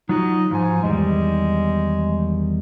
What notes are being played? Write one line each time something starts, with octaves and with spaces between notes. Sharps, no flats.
F#3 D#4 F4 F#4
G#2 F3 G#5
E2 D#3 G3 G#3